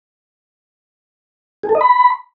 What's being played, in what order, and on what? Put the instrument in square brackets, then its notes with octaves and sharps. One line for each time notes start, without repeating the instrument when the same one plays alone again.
[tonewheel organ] G#4
A4
D#5
B5